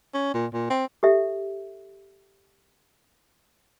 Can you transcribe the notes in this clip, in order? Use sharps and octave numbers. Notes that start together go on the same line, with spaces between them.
C#4
A#2
A#2
C4
G4 A4 E5